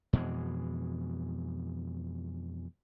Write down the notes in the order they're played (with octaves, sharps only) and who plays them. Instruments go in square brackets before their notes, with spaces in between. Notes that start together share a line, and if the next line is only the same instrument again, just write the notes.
[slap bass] F2 B2 E3 G#3